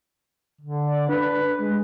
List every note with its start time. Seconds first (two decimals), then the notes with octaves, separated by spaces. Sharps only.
0.61 D3
0.86 D5
1.09 D4 B4
1.59 G#3